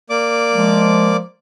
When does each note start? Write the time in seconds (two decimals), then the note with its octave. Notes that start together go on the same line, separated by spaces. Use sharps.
0.10 A#3 D5 D6
0.52 F3 G#3